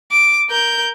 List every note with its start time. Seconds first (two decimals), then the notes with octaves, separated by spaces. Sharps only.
0.11 D6
0.50 A#4 G6